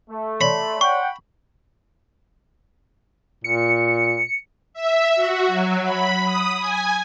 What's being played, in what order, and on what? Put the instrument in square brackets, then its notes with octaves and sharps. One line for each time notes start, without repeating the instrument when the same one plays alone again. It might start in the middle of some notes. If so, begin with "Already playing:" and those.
[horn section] A3
[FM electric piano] C#5 D5 C6 [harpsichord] B5
[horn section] F#5 G5 [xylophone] C#6
[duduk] A#2 [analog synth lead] C#7
[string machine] E5
F#4
F#3
B5
D#6
G#5